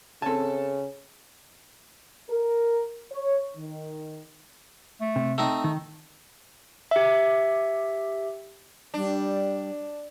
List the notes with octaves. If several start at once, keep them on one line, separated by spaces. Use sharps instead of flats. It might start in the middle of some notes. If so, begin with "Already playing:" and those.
C#3 C4 A4 G#5 A5
A#4
C#5
D#3
A3
C3
A3 C4 D#4
D#3
G4 E5
G3 D4